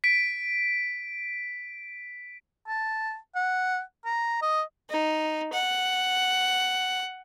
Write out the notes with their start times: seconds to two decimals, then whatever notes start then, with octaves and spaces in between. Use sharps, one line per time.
0.04 B6 D7
2.67 A5
3.35 F#5
4.05 A#5
4.42 D#5
4.90 D#4
5.53 F#5